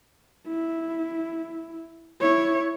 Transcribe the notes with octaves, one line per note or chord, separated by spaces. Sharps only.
E4
E4 C#5